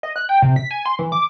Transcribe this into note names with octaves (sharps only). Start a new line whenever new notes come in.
D#5
F#6
G5
C3
B6
G#5
C6
E3
D6